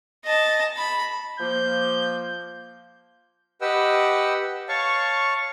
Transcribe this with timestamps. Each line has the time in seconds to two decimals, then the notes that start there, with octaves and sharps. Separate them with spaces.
0.25 D#5 A5
0.77 B5
1.40 F3 A#3 G6
3.61 G4 B4 D#5 F#5 G5 E6
4.69 C#5 F5 A5 C#6